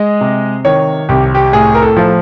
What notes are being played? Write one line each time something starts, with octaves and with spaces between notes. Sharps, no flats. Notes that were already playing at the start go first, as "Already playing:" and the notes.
Already playing: G#3 D#5
C3
D#3 C#5
C2 G4
G4
A2 G#4
A#4
A4
F3